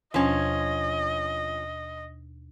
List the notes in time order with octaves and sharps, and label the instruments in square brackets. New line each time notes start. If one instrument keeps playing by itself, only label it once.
[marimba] D#2 B2 D4 [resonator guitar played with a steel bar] F3 C#4 [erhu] D#5